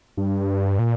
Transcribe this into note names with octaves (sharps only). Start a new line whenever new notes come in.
G2
A#2